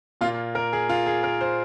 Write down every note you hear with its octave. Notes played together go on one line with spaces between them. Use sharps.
A#2 A#3 F4
A#4
G#4
F4
G#4
A#4
C5